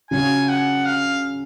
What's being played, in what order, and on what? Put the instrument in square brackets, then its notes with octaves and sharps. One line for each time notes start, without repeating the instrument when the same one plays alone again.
[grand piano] C#3 F#3 C#4 F4 [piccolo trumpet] G#5
[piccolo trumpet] F#5
F5